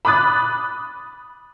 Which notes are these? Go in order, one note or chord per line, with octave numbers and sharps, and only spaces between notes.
B5 D6 D#6 F#6 A6